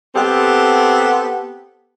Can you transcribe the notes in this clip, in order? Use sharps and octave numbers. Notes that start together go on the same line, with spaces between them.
B3 C4 G4 A4